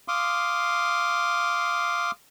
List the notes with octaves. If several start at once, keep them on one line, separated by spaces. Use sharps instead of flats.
F5 C6 D6 D#6